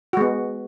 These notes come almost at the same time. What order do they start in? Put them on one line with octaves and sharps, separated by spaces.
F#4 G#3 B3